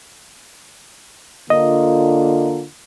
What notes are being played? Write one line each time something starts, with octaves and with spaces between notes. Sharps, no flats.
D3 A#3 F4 D#5